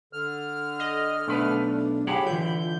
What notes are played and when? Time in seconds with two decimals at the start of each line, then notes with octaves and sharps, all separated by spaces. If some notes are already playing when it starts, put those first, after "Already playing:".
0.13 D3 F6
0.80 A4 D#5
1.28 B1 A3 D4 B4
2.07 F#3 G4 G#4 F#5 G5 B5
2.26 D3 E3 F4 G6